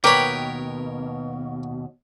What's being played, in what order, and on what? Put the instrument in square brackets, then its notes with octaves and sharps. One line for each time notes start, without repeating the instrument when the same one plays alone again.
[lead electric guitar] D#2 B2 [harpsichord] A#4 C#5 [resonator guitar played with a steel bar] B4 G5 [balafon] D6